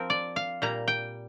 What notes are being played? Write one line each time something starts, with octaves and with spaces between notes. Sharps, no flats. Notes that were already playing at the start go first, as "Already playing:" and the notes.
Already playing: F3 C4 A#4
D5
F5
A#2 G3 A#3 A#5
G5